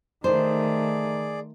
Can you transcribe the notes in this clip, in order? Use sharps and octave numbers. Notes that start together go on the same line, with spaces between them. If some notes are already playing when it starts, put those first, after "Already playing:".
D#3 A3 G#4 C5 D5